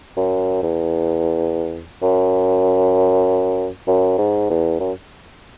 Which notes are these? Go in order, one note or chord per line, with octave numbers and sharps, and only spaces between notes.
F#2
E2
F#2
F#2
G#2
E2
F#2